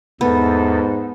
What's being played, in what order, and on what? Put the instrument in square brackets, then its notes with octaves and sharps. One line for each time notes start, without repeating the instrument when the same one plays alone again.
[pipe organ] E2 A4 [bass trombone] G#2 [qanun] B3